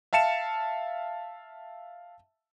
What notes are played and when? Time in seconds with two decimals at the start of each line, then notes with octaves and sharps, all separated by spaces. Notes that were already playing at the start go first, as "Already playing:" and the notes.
0.13 E5 F5 A5 C#7 E7